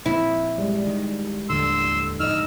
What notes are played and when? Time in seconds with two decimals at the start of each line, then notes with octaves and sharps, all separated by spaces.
0.06 A#2 F3 C4 E4
0.58 G3 G#3
0.86 D#3
1.49 D#2 A2 D3 F3 C6 E6
2.20 F2 A2 D#4 D#5 E6 F6